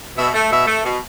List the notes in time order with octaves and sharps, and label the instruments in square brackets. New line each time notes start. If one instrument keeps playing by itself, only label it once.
[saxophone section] B2 E5
A3
B2 E5
A3
B2